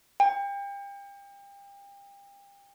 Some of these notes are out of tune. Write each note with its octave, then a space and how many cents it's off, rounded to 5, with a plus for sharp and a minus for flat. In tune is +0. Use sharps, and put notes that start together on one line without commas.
G5 +35